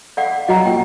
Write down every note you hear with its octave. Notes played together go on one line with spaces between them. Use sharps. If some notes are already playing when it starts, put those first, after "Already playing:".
D5 F5 F#5
F#3 D#5 F#5 A#5
A#2 G5